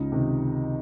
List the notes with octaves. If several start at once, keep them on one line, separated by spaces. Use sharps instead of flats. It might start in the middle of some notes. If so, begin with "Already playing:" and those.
Already playing: C#2 C#4 D#4
C3 D#3